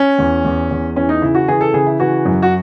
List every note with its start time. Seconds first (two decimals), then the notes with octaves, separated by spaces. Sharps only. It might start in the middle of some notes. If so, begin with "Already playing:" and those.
Already playing: C#4
0.18 E2
0.45 E2
0.71 E2
0.96 E3 C#4
1.09 D#4
1.22 C#3 E4
1.35 F#4
1.48 E3 G#4
1.61 A4
1.74 C#3 G#4
1.87 E4
2.00 E3 F#4
2.25 F#2
2.42 F#4